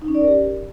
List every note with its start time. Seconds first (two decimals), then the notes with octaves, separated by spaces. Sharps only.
0.02 D#4
0.08 C#4
0.15 D5
0.21 A#4
0.27 G4